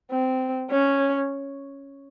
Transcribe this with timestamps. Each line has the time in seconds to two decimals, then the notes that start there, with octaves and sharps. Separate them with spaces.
0.11 C4
0.71 C#4